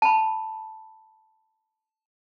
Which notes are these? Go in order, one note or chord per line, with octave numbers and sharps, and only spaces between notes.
A5 B5